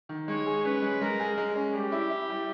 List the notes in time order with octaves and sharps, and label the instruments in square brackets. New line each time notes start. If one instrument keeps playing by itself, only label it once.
[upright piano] D#3
[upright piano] G#3 [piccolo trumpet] C#5
[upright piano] G#4
[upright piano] C#4 [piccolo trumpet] B4
[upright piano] G#3
[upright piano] G#3 [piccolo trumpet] A#4
[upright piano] G#4
G#3
C#4
[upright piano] G3 [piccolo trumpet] G4
[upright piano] E4
E4
G3